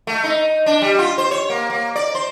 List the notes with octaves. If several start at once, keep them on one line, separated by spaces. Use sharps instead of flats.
A3
D#4
D4
G3
F4
C5
C#5
A#3
A#3
D5
C5